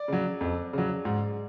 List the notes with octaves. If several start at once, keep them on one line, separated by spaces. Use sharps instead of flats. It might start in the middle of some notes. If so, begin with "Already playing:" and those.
Already playing: D5
C#3 F#3
F2
C#3 F#3
G#2